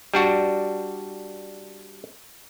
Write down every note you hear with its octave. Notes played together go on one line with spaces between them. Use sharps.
G3 D4 F#4